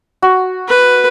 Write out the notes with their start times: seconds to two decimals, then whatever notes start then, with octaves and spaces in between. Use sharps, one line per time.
0.22 F#4
0.69 B4